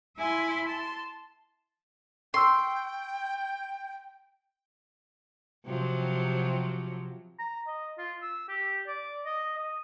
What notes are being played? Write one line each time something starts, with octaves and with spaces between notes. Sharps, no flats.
E4 E5 G#5 B5 C6
A5 C6
G5 C6 C#6 E6
C3 F3 F#3
A#5
D#5
F4
E6
G4
D5
D#5
D#6